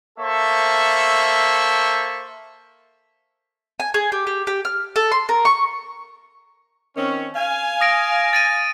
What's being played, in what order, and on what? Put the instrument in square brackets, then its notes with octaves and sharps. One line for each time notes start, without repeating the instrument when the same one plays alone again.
[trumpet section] A#3 A4 C5 E5 C#6
[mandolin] G#5
G#4
G4
G4
G4
F6
A4
C6
A#4
C#6
[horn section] D#3 C4 C#4
F5 G#5
[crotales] D#6 A#6 D7
A6 D7 D#7